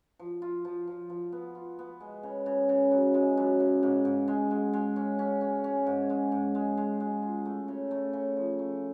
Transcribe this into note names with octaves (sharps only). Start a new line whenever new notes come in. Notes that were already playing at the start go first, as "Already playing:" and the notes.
F3
F4
F3
F3
F3
B3
F4
B3
G#3
C#3
C#3
C#3
F#2
G#3
F#2
C#3
G#2
G#2
G#3
G#3
G#3
C#4
C#4
C#4
C#4
G#2
G#3
G#2
G#3
G#3
G#3
F4
A3
C#3
A3
C#3
F3
A3